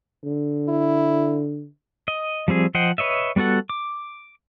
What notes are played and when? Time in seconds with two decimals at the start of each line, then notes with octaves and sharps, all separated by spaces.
0.24 D3
0.69 E4
2.08 D#5
2.48 F3 G3 C4 G#4
2.75 F3 C5 D#5 F#5 G5
2.98 B4 C#5 D#5 E5
3.36 G3 B3 F#4 A4 F#5
3.70 D6